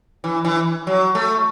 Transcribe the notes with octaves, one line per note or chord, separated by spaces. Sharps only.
E3
E3
F#3
A3